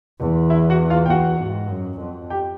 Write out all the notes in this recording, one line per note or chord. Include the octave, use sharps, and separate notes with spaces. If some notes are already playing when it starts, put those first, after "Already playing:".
E2
E4 E5
F#4 F#5
F4 F5
G5
E2 F#4 F#5
G#2
F#2
F2
G4 G5